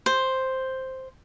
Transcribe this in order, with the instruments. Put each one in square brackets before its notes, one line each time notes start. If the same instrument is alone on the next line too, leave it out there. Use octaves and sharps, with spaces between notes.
[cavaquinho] C5